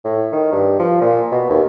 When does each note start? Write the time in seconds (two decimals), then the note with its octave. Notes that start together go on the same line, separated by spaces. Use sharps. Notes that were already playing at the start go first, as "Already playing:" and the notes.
0.05 A2
0.32 D#3
0.52 G2
0.79 F3
1.02 A#2
1.32 B2
1.50 D#2